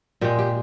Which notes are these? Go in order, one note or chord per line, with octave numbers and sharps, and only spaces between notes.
A#2 G#3 G4
G4